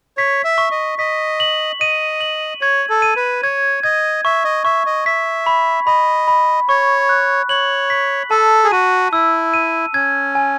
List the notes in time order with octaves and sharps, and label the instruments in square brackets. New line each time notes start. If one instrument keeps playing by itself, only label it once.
[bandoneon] C#5 [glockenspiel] B6
[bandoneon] E5
[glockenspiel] C#6
[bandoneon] D#5
[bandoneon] D#5 [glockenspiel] B6
[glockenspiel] F#7
[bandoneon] D#5 [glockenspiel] D#7
[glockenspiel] F#7
[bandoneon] C#5 [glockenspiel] G#6
[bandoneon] A4
[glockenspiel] D#7
[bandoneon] B4
[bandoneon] C#5 [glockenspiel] G#6
[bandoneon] D#5 [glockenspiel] G#6
[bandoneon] E5 [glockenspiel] C#6
[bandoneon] D#5
[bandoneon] E5 [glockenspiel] C#6
[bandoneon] D#5
[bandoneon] E5 [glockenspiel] B6
[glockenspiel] B5
[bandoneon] D#5 [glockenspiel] B5
[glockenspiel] B5
[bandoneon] C#5 [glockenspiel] C#6
[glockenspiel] F#6
[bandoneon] C#5 [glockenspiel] F#7
[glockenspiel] B6
[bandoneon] A4 [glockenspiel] A5
[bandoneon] G#4
[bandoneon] F#4 [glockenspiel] D#7
[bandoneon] E4 [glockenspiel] E6
[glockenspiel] D#7
[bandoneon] C#4 [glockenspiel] G#6
[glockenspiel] G#5